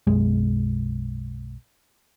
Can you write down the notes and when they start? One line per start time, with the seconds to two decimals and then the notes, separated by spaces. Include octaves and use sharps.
0.07 B1 F#2 G#3